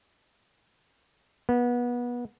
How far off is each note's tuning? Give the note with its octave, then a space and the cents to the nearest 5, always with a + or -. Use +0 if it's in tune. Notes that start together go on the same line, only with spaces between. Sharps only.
B3 -25